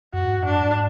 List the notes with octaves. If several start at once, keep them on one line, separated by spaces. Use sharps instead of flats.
F#2 F#4
G#2
F#2
D4
G#2